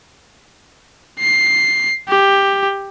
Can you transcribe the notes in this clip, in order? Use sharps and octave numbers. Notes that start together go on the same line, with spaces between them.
C7
G4